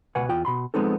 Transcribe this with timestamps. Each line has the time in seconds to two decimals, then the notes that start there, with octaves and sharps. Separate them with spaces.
0.15 C#2 B2 B4 F#5 G#5
0.29 E2 F4 G5
0.45 B2 B5 C6
0.74 F3 G#3 B3 C4 D#4 A4